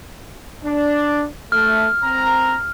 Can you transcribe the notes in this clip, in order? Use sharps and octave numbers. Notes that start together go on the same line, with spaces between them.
D4
A3 F6
C4 A#5